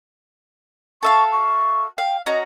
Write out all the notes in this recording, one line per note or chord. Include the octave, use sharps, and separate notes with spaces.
A4 E5 F5 C#6
C#6
F5 G5
C#4 F#4 D#5 A#5